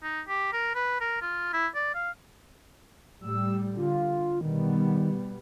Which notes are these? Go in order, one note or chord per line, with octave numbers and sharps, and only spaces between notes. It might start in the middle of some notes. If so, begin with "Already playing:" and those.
D#4
G4
A#4
B4
A#4
F4
E4
D5
F5
A2 G3 E6
D3 F4
B2 D#3 G3 B3